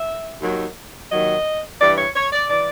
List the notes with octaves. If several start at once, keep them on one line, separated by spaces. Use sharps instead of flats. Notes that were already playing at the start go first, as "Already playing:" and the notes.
Already playing: E5
D#2 D#3 F#3
D#2 D#3 F#3 D#5
G2 E3 D5
C#5
C#5
D5
E3 D5